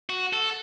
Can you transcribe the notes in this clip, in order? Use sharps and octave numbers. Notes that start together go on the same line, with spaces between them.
F#4
A4